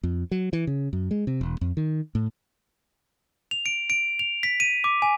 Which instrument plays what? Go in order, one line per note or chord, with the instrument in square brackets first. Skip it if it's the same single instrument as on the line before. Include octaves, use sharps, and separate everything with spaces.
[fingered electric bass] F2
F#3
E3
C#3
F#2
G#3
C3
E1
F2
D#3
A2
[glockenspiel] F7
D7
D7
F7
B6
D#7
D6
G#5